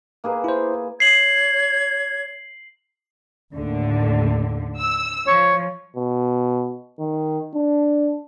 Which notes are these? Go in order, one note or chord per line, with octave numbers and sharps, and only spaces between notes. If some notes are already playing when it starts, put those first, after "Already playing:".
A#3 G#4 B4
E4 C5
C#5 G#6 C7 F#7
D#2 A2 D3
E6
F3 C#5
B2
D#3
D4